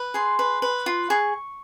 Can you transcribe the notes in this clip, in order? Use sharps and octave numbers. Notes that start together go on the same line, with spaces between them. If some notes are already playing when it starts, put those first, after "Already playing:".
Already playing: B4
G#4 C6
B4
B4
F4
G#4 C#6